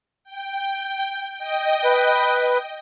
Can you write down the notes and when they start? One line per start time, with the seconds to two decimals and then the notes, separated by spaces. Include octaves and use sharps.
0.24 G5
1.35 D#5 G5
1.84 B4